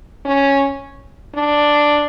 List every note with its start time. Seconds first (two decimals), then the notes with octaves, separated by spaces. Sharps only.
0.25 C#4
1.35 D4